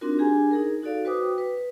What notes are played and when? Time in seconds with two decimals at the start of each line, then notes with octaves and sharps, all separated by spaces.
0.01 C4 D4 D#4 F4 F#4 A#4
0.18 D4 G4 G#4 G#5 A#5
0.51 D#4 G#4 A#4
0.82 D#4 F#4 A4 D5 F5
1.05 F#4 B4 C5 G5 D6 D#6
1.38 B4